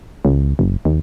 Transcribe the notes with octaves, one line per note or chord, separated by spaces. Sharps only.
C#2
F#1
D#2